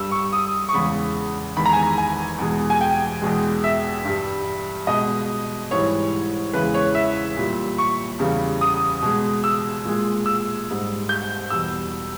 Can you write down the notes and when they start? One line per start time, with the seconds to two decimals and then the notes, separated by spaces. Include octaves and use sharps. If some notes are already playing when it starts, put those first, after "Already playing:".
Already playing: G2 G3 E6
0.11 C#6
0.33 D#6
0.69 C#6
0.73 E2 C#3 G#3 B5
1.57 E2 D#3 G#3 B5
1.66 A#5
1.73 G#5
1.83 A#5
1.98 G#5
2.39 E2 B2 G#3
2.70 G#5
2.81 G5
3.22 E2 B2 G#3
3.64 E5
4.05 G2 G3
4.87 B2 G#3 D#5
5.71 G#2 E3 G3 C#5
6.54 E2 C#3 E3 G#3 B4
6.74 C#5
6.95 E5
7.37 A#2 G3
7.78 C#6
8.19 E2 C#3 G3
8.61 D#6
9.02 B2 G#3
9.44 E6
9.85 A#2 G#3
10.26 E6
10.68 G#2 G3
11.09 G6
11.50 E2 B2 G3 E6